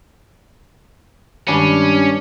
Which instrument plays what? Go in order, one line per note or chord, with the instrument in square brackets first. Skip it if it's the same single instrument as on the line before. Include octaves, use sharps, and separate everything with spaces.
[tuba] G2 [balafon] D#3 G#3 B5 [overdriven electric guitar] C#4 [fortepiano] D4